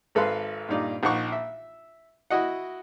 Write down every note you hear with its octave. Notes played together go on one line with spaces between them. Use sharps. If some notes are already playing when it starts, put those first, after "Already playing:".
G#1 A4 B4 F5 C6
G2 A#2 D#4 D5
A#1 D#4 F#5 C#6
E5
E4 F#4 D#5 F#5